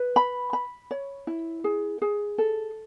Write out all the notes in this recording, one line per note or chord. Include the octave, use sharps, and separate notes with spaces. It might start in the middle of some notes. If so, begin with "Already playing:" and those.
Already playing: B4
B5
B5
C#5
E4
G#4
G#4
A4